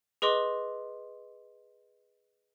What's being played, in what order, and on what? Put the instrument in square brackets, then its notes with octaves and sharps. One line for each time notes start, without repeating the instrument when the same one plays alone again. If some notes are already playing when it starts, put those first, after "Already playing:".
[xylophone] G#4 B4 D#5 C6 D6